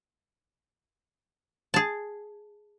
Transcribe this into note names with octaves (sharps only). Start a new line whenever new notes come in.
G#4 A5